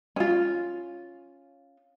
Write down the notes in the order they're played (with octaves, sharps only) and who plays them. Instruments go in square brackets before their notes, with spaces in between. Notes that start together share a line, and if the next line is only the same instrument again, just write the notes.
[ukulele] C#4 F4